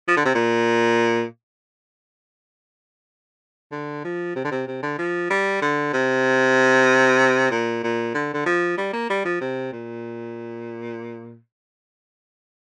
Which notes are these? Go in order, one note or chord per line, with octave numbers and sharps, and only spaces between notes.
F3
D3
C3
A#2
D3
F3
C3
D3
C3
C3
D3
F3
G3
D3
C3
A#2
A#2
D3
D3
F3
G3
A#3
G3
F3
C3
A#2